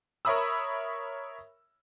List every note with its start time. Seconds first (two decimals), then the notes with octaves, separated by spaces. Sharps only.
0.25 A#4 C#5 E5 B5 D#6 E6